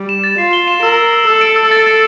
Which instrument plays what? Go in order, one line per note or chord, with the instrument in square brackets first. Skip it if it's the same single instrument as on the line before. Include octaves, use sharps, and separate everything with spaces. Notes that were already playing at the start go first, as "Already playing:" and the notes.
Already playing: [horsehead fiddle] G3
[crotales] E7
A6
[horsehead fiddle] F4 [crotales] C7
[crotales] G7
E7
[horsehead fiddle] A#4 [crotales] E6
[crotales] E6
E6
[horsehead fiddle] A4 [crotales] E6
[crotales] D7
E6
A6
A6